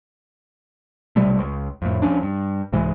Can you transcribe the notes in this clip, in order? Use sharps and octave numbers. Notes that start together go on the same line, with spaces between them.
B1 C3 G3 A3
C#2
F2 A2
D#2 F3 C#4 D4
G2
C2 G#2 E3 G#3